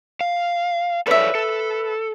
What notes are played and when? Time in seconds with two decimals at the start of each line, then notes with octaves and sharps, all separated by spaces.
0.21 F5
1.07 A4 B4 C#5 D5 E5
1.35 A4